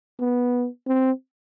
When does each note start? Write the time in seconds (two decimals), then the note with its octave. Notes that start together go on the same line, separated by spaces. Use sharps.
0.20 B3
0.87 C4